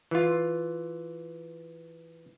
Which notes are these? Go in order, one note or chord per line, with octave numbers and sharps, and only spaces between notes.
E3 F4